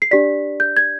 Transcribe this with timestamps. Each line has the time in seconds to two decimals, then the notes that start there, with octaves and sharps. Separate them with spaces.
0.02 C7
0.11 D4 G4 D5 B6
0.60 G6
0.77 G#6